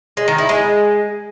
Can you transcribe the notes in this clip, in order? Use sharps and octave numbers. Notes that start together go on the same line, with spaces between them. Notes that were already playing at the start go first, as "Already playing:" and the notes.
G#3
D#3
E4
G#3